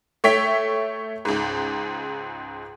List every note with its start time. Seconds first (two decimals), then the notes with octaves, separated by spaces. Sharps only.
0.24 A3 C#5 E5 G5 B6
1.25 C#2 G#2